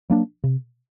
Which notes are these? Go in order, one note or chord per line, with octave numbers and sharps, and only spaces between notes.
F#3 A#3 D4
C3